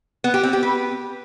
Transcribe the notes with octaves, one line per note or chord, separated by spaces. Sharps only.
B3
G4
C4
G4
B4